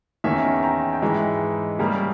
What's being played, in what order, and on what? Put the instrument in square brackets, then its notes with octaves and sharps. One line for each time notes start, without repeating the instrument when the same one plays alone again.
[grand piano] E2 D#3 A#3 C#4 E5 G#5
G5 A#5
G5
G#2 E3 G#3 D#4 E5
C#3 G3 A#3 C#4